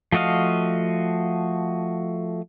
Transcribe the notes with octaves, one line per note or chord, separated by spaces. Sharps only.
F3 A3 F#4 D#5 F5